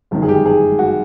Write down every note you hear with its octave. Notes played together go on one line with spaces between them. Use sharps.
G1 F#2 D#3
G#4
G4
G#4
F#4